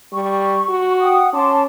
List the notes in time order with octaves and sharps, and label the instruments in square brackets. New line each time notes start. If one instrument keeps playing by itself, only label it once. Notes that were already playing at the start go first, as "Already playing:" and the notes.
[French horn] G3 [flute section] C#6
[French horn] F#4
[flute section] F#5 G5 D#6
[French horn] C#4 [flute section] A5 C6 D6